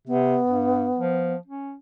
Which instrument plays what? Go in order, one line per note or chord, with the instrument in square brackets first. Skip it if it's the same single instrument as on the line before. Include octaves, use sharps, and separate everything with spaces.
[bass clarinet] C3 [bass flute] B3
[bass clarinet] G2
F3
C#4